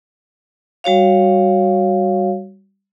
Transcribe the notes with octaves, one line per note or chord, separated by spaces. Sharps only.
G3 F#4 C#5 F5